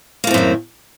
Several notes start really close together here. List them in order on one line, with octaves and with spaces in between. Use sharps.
A#3 A2 C4 F#2 D#3